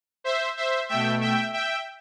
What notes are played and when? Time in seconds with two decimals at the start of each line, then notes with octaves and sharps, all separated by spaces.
0.24 C5 E5
0.57 C5 E5
0.89 B2 A3 E5 G5
1.21 E5 G5
1.53 E5 G5